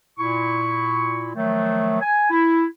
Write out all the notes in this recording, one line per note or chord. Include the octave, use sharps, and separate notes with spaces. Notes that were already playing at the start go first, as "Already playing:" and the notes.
A#2 E4 C#6
D#3 F3 F#3 A3
G#5
E4